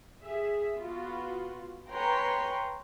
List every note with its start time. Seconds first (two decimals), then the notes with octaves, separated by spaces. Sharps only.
0.21 G#4 E5
0.74 B3 F4 F#4
1.89 B4 C#5 G5 G#5 A#5 C6